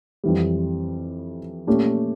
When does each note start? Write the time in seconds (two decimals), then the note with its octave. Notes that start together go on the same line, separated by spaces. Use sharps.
0.24 F2 E3 G3
1.67 A#2 A3 C#4 G4